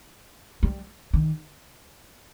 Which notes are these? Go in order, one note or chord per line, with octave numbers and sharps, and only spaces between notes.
G3
D#3